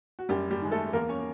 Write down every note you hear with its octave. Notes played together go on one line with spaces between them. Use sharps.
F#4
F#2 G3 G4
G3 G4
D#3 G#3
A3 A4
E2 A#3 A#4
C#4 C#5